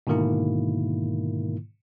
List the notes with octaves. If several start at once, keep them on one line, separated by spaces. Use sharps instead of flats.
G#2 B2 D3 D#3 A#3 E4